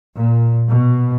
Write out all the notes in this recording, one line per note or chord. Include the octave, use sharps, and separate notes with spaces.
A#2
B2